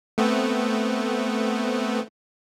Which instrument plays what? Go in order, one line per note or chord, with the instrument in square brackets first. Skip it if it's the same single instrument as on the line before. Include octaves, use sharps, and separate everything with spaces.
[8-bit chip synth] A3 B3 C4